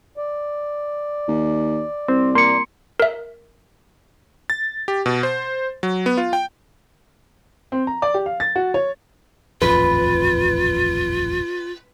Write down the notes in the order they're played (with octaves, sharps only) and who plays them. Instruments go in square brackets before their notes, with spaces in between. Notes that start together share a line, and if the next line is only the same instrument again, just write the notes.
[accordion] D5
[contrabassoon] D#2
[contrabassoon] C2 [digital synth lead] C4
[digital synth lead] A#3 [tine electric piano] C6 C#7
[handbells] A#4 E5
[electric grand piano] A6
G4
B2
C5
F#3
B3
F4
G5
[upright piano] C4
A#5
D5
G4
F5
A6
F#4
C#5
[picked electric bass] D#1 A1 F2 [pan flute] F4 [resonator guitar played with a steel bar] B4